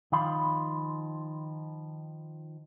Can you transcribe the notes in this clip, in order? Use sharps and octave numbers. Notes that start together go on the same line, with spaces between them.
D#3 F3 F5 B5 C6